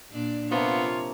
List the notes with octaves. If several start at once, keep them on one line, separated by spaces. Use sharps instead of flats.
A#2 D4 D5
C3 F3 A#3 B3 F4 C#5